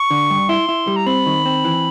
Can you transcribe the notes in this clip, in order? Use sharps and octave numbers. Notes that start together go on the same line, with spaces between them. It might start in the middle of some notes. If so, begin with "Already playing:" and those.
Already playing: C#6
D3
G2
E4 C6
E4
G3
A#5
C4 B5
D#3
C4
E3